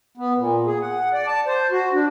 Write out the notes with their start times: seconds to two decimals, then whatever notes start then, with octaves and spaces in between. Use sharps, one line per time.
0.17 B3
0.38 A#2
0.66 G#4
0.81 F#5
1.13 D5
1.27 A5
1.47 C5
1.71 F#4
1.93 D4